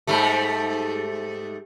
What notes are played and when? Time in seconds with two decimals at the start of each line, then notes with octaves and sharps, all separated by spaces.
0.07 G#2 G3 A3